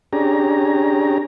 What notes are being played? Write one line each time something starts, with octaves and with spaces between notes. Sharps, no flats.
C#4 D4 G4 G#4 A#5